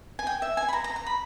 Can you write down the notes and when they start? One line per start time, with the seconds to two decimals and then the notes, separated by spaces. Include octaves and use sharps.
0.19 G#5
0.27 G5
0.42 E5
0.57 G#5
0.69 B5
0.73 A#5
0.84 A#5
0.96 A#5
1.06 B5